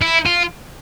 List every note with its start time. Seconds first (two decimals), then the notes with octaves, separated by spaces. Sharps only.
0.02 E4
0.26 F4